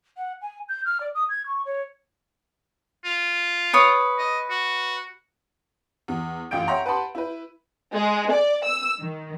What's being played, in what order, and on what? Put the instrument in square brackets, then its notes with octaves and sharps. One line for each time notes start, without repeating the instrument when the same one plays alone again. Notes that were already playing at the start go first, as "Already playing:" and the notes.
[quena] F#5
G#5
G6
F6
D5
D#6
G#6
C#6
C#5
[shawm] F4
[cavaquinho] B4 C#5 D#6
[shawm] D#5
F#4
[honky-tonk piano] E2
A1 F#2 F4 G5 G6 D7
C#5 E5 F#5 G5 A#5 C6
B4 F#5 A5 B5 C6
E4 B4
[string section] G#3
D5
E6
D#3